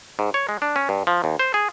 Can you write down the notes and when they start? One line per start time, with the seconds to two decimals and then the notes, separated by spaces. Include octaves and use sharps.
0.19 G#2
0.34 C#5
0.49 G#3
0.62 D4
0.76 C#4
0.89 G2
1.07 F3
1.24 D#2
1.39 C5
1.54 G#4